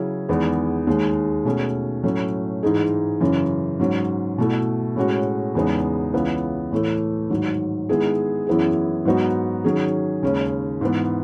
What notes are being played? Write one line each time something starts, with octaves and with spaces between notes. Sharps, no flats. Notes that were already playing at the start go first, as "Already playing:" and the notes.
Already playing: C#3 F#3 C#4 E4 G#4
E2 D#3 G#3 B3
D#2 D#3 G#3
B2 A3 C#4 G#4
A2 F#3 A3 C#4
G#2 E3 G#3 D#4 G#4
F#2 C#3 E3
G#2 F#3 C#4
B2 A3 E4
A2 G#3 C#4 F#4
E2 C#3 G#3 B3 D#4
C#2 C#3 E3 B3
A2 E3 A3
G#2 D#3 F#3
D#3 G#3 B3 E4 G#4
F#2 E3 B3 E4 G#4
G#2 F#3 B3 D#4 F#4
D#3 F#3 C#4 G#4
D#2 C#3 G#3 C#4
G#2 E3 B3